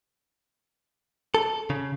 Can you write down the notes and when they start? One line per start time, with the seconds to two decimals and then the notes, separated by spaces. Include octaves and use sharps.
1.35 A4
1.70 C#3